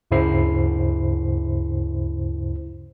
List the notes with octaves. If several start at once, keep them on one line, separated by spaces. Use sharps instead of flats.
D2 G2 C#3 E4 C5 C7